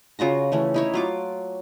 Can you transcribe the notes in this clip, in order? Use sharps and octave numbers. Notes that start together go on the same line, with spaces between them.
C#3 F4 F#4 A#5
E3 A3 C#4
D#4 E4 C#5
F#3 F4 D6